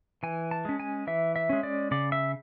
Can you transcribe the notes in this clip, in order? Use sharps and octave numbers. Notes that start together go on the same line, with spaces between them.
E3 G#5
A5
G#3 C#4
G#5
E3 E5
E5
G#3 C#4
D5
C#3 D5
E5